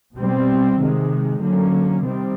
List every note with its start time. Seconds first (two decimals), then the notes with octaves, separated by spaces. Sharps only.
0.16 B2 G3 C4
0.78 C3 D#3 G#3
1.41 D3 F#3 A#3 C#4
2.04 C3 D#3 G3 C4